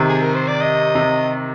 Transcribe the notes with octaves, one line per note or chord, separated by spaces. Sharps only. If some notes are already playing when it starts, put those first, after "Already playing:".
Already playing: C3 D#3
G#4
A#4
C5
D5
D#5
C3